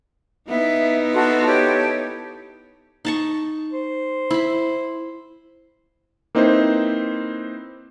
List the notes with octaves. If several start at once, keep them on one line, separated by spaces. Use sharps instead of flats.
B3 D#4 E4 E5
F#4 A4 C6
G4 A4 C#5
D#4 A5 C#6
C5
E4 B5
A#3 C4 D#4 E4 B4 C5